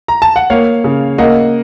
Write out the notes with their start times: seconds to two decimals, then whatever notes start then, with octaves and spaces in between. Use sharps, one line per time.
0.08 A#5
0.22 A5
0.36 F#5
0.50 A#3 C#5 F5
0.84 C#3
1.18 A#3 D#5 F#5